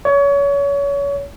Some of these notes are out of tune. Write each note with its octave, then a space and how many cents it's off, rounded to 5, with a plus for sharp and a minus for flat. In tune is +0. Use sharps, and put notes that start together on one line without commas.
C#5 +30